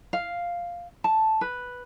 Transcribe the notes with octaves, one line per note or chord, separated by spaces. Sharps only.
F5
A5
B4